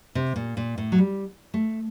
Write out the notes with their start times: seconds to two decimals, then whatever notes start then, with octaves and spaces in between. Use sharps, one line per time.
0.15 C3
0.36 A#2
0.57 A#2
0.78 A2
0.92 F#3
0.98 G3
1.54 A3